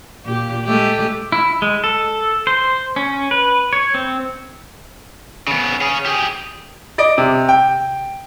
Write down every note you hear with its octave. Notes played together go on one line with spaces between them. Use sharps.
A#2 G4
G#3 A3 G4
E4
G#3
A4
C5
C#4
B4
C#5
C4
C#3 B3
C#4 G#4
G4 G#4
D5 D#5 D7
C3
G5